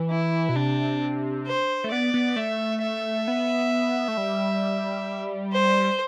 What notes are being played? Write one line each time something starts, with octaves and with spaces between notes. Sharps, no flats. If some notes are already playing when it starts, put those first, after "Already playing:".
Already playing: E3
E4
B2
C3 D4
C5
A3
B3 D5
B3
A3 E5
E5
B3
A3
G3
C5